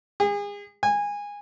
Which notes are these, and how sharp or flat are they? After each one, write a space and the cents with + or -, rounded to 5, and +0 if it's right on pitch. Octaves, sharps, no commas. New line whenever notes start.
G#4 -35
G#5 -20